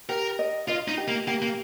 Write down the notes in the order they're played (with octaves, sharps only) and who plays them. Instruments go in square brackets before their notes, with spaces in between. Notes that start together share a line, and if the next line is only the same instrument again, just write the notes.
[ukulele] G4 [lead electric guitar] A#4
[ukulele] D#5
[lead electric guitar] F4 [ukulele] D#5
[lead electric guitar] D#4
[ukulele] G4
[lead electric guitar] A#3
[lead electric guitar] A#3 [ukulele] G4
[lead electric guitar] A#3